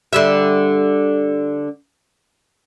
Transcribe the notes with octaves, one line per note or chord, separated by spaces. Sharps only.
D3 G3 E5